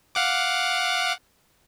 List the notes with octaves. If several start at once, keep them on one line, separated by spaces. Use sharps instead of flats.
F5 F#5 D6